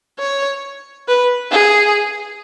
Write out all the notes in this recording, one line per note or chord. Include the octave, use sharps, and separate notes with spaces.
C#5
B4
G#4